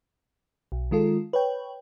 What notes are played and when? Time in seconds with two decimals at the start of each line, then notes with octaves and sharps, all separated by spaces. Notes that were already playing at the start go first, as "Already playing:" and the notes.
0.72 B1
0.91 D#3 G#3 F4 A4
1.33 B4 C#5 G5